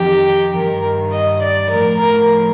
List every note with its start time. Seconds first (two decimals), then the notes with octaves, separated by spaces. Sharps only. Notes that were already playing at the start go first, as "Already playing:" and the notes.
Already playing: F2 D#3 G4
0.56 G2 D#3 A#4
1.13 D#5
1.43 D5
1.71 A2 F3 A#4
2.01 A#4